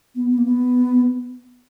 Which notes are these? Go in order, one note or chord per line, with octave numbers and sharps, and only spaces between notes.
B3
B3
A#3
B3